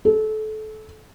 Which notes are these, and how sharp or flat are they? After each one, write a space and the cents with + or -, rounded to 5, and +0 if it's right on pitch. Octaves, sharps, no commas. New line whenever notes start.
A4 -25